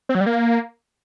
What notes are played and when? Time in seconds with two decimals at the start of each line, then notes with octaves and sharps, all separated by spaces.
0.09 C4
0.15 F#3
0.21 G3
0.26 A#3